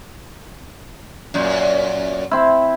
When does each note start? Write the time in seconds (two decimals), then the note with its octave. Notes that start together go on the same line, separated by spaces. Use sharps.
1.34 F#2 A#2
2.31 C4 E4